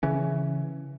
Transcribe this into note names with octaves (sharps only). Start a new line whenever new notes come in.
C#3 E3 C#4